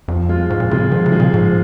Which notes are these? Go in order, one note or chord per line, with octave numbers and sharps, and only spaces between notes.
F2 F3
G#3 F4
G#2 F3
A#2
C#3 G#3 F4
D#3 F3
C#3
G#3 F4
A#2
G#2 F3